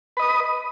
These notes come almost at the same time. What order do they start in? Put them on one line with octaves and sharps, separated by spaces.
B4 D#5 D#6